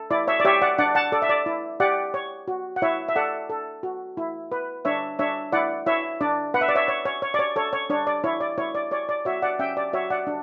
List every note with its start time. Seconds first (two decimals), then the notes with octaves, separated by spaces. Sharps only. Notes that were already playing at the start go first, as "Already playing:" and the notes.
Already playing: A4
0.11 E4 D5
0.27 C#5 E5
0.40 D5
0.45 G4 C#5 E5
0.62 D5 F#5
0.78 D4 D5 F#5
0.95 F#5 A5
1.12 A4 D5
1.22 E5
1.29 D5
1.46 E4
1.80 G4 D5 F#5
2.14 C#5
2.48 F#4
2.76 F#5
2.82 E4 C#5 E5
3.09 E5
3.16 A4 D5 F#5
3.50 A4
3.83 F#4
4.17 E4
4.52 B4
4.85 D4 C#5 E5
5.19 D4 C#5 E5
5.52 E4 D5 F#5
5.86 E4 C#5 E5
6.21 D4 D5
6.54 B4 F#5
6.61 E5
6.68 D5
6.75 C#5 E5
6.88 C#5
7.05 C#5
7.22 C#5
7.34 D5
7.39 C#5
7.56 A4 C#5
7.73 C#5
7.90 D4 C#5
8.07 D5
8.24 E4 C#5
8.40 D5
8.58 E4 C#5
8.75 D5
8.91 C#5 D5
9.09 D5
9.25 F#4 C#5 E5
9.42 D5 F#5
9.59 C#4 E5 G5
9.77 D5
9.93 F#4 C#5 E5
10.10 D5 F#5
10.27 D4